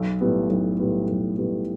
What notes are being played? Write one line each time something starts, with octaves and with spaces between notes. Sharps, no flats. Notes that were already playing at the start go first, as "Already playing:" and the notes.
Already playing: B1
A2 G3 B3
B1
A2 G3 B3
B1
A2 G3 B3